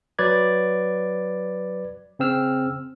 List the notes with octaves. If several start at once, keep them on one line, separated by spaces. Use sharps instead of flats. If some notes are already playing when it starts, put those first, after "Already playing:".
F#3 B4 D5 G#6
C#3 C4 E6 F6